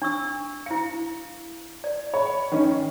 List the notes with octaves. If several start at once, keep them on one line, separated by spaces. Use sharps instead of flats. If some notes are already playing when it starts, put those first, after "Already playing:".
D4 C#6 E6
E4 F5 C#7
D5
C#5 B5
D#3 C#4